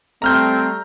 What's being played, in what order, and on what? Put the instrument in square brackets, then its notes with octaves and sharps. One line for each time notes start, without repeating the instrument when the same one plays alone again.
[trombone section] G3 A3 [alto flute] C4 [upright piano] A#5 F6 G6